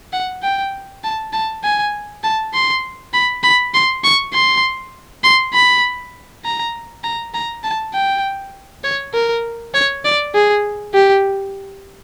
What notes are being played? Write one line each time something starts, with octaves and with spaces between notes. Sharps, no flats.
F#5
G5
A5
A5
G#5
A5
C6
B5
B5
C6
C#6
C6
C6
B5
A#5
A#5
A#5
A5
G5
C#5
A#4
C#5
D5
G#4
G4